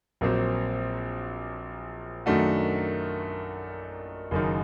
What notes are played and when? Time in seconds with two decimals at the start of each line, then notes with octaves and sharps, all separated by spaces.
0.21 A#1 A#2 F#3 C4
2.26 F#2 D#3 A3 D4 F#4
4.31 F#1 F#2 D#3